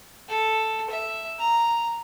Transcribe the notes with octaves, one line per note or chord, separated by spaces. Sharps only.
A4
E5
A#5